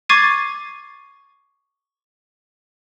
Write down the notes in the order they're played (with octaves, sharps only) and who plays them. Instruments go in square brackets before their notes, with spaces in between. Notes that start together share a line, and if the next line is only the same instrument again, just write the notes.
[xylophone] C#6 D6 G#6 A6 C7 D#7